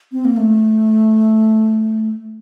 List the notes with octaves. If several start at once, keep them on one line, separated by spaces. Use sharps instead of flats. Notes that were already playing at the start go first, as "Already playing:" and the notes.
C4
A#3
A3